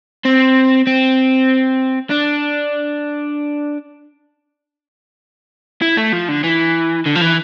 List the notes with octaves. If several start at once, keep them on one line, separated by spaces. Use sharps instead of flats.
C4
C4
D4
E4
A3
F3
D3
E3
D3
F3
E3